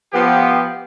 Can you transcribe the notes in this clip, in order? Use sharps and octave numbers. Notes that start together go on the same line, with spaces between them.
F3 B3 G4